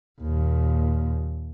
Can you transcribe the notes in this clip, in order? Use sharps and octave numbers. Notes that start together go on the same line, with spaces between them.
D#2 A#2